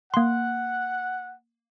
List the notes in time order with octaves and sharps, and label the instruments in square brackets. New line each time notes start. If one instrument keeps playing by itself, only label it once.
[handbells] A#3 C6 [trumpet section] F#5